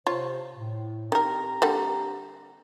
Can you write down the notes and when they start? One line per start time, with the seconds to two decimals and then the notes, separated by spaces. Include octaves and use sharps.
0.07 C3 F4 C5 C#5
0.55 A2
1.12 D#3 C4 G4 A#4 A#5
1.62 D3 G3 A#3